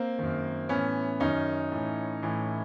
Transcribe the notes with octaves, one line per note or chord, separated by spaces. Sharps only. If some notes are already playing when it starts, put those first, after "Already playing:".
Already playing: A#3 C4
F#2 D#3
A2 E3 B3 C#4
F#2 D#3 C#4 D#4
A2 E3
A2 E3